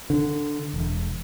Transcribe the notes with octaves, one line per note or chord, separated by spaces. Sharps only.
D3
E1